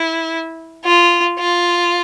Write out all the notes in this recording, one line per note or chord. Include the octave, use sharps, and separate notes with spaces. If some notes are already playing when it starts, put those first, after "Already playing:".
Already playing: E4
F4
F4